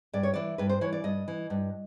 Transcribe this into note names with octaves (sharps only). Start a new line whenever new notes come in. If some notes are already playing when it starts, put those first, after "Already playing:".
G2 D5
C#5
E3 D5
G2 B4
C5
E3 C#5
D5
G2 D#5
E3
G2